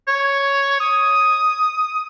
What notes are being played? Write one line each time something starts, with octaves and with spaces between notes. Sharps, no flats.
C#5
D#6